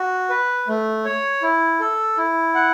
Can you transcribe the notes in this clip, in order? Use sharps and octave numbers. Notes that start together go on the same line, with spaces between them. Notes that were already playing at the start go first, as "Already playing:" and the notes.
Already playing: F#4
B4
A3
C#5
E4
A4
E4
F#5